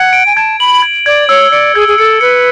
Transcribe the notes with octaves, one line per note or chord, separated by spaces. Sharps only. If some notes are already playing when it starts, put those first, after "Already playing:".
Already playing: F#5 G#6
D7
G#5
A5 G#6
B5 F#7
G#6
D5 G#6
C#5 E6
D5 C#7
G#4 G#6
G#4
A4 C#7
B4 C#7